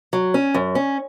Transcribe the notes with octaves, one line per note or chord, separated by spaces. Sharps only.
F#3
C#4
F#2
C#4